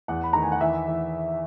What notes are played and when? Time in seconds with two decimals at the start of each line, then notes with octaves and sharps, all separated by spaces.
0.08 E2 F#5
0.24 B5
0.33 D#3 A#5
0.42 G#5
0.52 F#5
0.61 E3 E5
0.88 E3